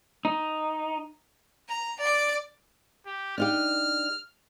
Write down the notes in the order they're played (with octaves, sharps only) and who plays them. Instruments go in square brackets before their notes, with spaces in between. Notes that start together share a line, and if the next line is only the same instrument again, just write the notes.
[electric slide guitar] D#4
[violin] A#5
D5 D6
[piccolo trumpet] G4
[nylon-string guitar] D4 D#4 G4 [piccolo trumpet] F6